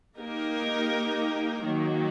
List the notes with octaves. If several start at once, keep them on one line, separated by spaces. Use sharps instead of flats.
A#3 D#4 G4 A#4
D#3 F#3 A#3